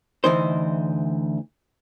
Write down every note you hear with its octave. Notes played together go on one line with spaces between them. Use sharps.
D2 E3 D#4 C5